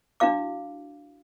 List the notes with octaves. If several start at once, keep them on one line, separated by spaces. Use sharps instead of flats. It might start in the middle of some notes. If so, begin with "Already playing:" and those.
D4 E4 F#4 F5 D6